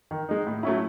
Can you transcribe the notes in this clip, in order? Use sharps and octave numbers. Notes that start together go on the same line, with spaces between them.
D#3
G#3 D#4
A2
F#3 A3 C#4 E4